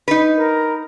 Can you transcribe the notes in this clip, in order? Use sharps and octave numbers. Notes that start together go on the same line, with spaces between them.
D#4 B4
A#4